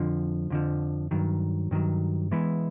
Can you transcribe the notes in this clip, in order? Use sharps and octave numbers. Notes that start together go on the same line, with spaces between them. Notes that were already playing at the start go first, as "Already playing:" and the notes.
Already playing: F2 D3 F3
F2 D3 F3
G2 D#3 F#3
G2 D#3 F#3
E3 G#3 B3 E4